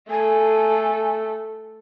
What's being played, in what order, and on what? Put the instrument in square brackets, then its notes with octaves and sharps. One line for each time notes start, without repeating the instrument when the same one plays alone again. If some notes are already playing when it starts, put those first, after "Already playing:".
[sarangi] A3 [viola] A4 [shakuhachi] G#5